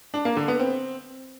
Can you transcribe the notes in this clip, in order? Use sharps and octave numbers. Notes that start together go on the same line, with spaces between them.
D4
A#3
D3
B3
C4